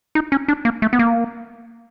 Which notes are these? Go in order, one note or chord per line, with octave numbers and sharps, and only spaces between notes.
D#4
C#4
D4
A#3
A3
B3
A#3